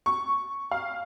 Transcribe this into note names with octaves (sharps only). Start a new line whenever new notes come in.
C#6
F5